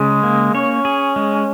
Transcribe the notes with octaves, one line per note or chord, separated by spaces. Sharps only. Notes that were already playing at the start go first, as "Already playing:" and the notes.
Already playing: C#3 G#3
A#3
C#4 C#5
G#4
G#3